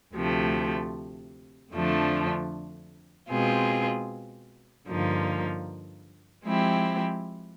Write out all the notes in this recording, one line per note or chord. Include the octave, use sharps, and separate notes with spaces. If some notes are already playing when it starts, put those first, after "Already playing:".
D2 C3 F3 A3
F2 D3 F3 A3 D4
B2 G#3 C4 F4 G#4
G2 D3 F3 A#3 D#4
F3 G#3 C4 E4 G4